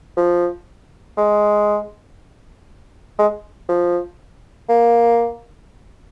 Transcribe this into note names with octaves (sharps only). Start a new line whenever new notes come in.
F3
G#3
G#3
F3
A#3